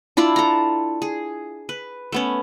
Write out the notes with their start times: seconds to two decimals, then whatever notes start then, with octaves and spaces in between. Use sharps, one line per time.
0.17 D4 E4 F4 D5
0.36 A4 A#5
1.02 G#4
1.69 B4
2.12 A3 B3 C#4